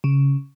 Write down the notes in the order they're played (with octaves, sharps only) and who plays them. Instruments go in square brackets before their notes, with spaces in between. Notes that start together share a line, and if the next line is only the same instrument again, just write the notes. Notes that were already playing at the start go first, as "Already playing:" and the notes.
[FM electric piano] C#3